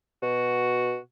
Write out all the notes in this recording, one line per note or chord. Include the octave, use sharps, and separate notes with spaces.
B2 F#4